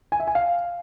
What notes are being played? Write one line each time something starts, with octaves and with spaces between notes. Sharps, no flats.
G#5
E5
G#5
F5